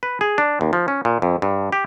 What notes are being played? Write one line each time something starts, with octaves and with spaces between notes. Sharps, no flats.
B4
G#4
D4
D#2
F3
C#4
A#2
F2
G2
G4